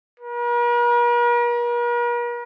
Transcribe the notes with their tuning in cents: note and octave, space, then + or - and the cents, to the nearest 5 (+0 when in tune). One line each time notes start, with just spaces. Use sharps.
A#4 +45